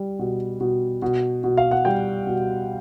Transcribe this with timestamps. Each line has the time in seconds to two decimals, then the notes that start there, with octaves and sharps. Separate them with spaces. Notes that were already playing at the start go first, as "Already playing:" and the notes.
Already playing: G3
0.19 B2
0.60 B2
1.02 B2
1.44 B2
1.57 F5
1.71 F#5
1.85 G3 G5
2.27 B2